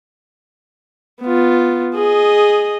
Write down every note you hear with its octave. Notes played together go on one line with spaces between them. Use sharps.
B3 F4
G#4 D#5